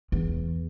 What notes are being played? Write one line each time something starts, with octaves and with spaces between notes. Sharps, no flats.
E2